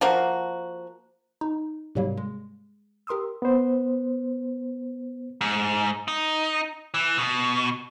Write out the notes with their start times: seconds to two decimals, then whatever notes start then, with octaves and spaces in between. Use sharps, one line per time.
0.01 F3 A#3 F#4
1.41 D#4
1.95 G#2 C3 F#3 G3 A#3
2.17 G#3
3.07 G4 A#4 C6 D#6 E6
3.42 B3 C5
5.41 G#2
6.08 D#4
6.94 E3
7.18 B2